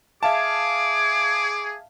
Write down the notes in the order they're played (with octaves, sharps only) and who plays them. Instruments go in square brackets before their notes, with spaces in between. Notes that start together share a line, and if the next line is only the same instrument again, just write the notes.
[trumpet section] G#4 [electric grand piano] E5 F5 A5 [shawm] D6